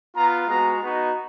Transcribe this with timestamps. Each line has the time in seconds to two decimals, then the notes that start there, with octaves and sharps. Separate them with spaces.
0.15 B3 F4 A#5
0.48 G#3 B3 F#4 A#5
0.80 B3 D#4 F#4